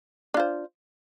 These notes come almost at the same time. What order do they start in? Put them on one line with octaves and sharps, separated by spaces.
D4 F4 C5